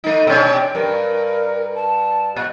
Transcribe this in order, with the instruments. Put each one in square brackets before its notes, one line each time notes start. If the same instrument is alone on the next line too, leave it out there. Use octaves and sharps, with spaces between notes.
[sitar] A3 D#4
B2 C#4 D4
[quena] G5
[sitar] G2 [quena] A#4
[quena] A5
[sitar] A#2 [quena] F#6